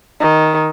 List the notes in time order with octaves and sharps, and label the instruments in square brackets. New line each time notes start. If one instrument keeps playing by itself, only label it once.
[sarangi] D#3